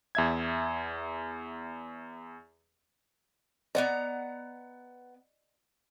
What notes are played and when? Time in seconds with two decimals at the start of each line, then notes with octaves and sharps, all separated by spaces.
0.15 E2 E5 G#6
3.75 B3 D5 D#5 F#5 A#5